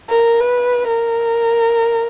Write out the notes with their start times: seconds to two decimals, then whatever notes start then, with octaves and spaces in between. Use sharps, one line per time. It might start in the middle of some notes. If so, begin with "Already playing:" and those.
0.10 A#4
0.41 B4
0.88 A#4